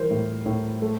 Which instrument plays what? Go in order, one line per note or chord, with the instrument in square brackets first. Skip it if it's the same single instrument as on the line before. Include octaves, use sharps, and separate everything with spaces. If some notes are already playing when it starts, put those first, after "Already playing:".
Already playing: [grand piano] E3 G3 A#4 C5
A2
A2
A3